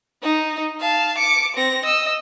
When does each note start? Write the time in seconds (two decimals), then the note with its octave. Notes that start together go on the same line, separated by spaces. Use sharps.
0.22 D#4
0.80 F5 A5
1.18 D6 C#7
1.56 C4 A#6
1.85 D#5 E6